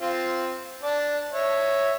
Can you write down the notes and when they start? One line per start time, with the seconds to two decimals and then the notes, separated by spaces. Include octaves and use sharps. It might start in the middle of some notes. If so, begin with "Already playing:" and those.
0.01 C4 F4
0.83 D4 D5
1.33 C#5 E5